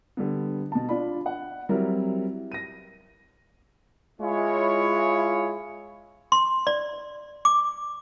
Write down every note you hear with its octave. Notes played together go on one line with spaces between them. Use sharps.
D3 G3 B3
B2 A5
D4 F4 D5 B5
F#5
F#3 G3 C4 E4 A#4
A#6 D#7
G#3 E4 F4 C#5
C6
D5
D6